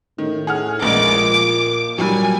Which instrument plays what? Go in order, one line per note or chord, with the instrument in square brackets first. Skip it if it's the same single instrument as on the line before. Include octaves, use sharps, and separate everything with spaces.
[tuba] A2 [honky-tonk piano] D#3
[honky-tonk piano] G#4 F#5 F6
[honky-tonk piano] A#1 G#3 [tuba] A#2 [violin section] D6
[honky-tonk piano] F3
[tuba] A#2 [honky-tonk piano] F#3 G3 [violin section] G#5